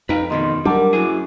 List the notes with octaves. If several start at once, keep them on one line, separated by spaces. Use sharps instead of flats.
F2 D#4 B4 A#5
D2 B2 D#3 D#5 C6
F#3 G3 D4 A#4 F#5 D6
F#2 E4 F#4 G#4